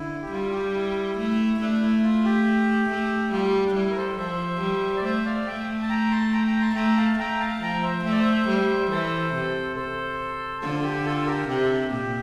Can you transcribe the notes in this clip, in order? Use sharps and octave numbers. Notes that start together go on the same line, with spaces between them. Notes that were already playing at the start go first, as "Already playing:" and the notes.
Already playing: D3 E4
G4
G3 F4
G4
E4
A3
A3 D4
E4
F4
G4
A3
G3 F4
D4
G3 E4
A#4
A4 C5
F3 C5 E5
G3
D5
A3 C5 E5
D5 F5
A3 E5 G5
A5
G5 A#5
A5 C6
G5 A#5
G5 A#5
A5 C6
A3 G5 A#5
F5 A5
A3 G5 A#5
F5 A5
F3 G5 A#5
C5 E5
A3 E5
D5
C5 E5
G3
E3 A4 C5
C3
A4 C5
D3 F4 A4
A4
G4
F4 A4
G4 A#4
C3 G4
A4
G4
A#2 G4